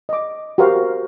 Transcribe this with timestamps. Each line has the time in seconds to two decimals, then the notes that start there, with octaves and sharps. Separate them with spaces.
0.09 D#5 D6
0.58 F#4 G4 A#4 C5 F5